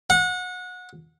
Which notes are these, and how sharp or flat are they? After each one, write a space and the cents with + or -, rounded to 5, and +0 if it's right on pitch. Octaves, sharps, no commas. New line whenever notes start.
F#5 -25